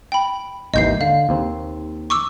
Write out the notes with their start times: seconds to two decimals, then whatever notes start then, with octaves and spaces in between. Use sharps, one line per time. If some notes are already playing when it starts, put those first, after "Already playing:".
0.12 G5 B5
0.74 G#1 D#2 E3 D#5 G6 C7
1.01 D3 F5
1.29 D#2 C4
2.10 C#6 D6 E6